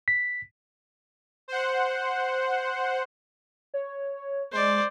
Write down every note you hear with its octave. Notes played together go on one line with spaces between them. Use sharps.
B6
C5 F#5
C#5
G#3 C5 D5